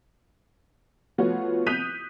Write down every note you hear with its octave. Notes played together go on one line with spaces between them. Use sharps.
F3 A3 B3 F4 F#4 C#5
D#6 F#6 G6 B6 D#7 F7